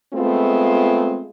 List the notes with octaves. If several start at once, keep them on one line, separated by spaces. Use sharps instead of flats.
G#3 A3 B3 C4 F4